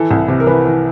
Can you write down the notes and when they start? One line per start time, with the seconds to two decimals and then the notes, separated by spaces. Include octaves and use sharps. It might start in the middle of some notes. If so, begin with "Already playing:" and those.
Already playing: E3 A4
0.11 C2
0.28 C3
0.40 A#4
0.46 E3 B4
0.65 E3